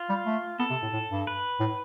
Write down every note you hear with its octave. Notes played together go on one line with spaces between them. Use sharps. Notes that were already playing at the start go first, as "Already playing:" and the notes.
Already playing: F4
G3
A3
B3 A4
C3
A2
A2
G2
B4
A2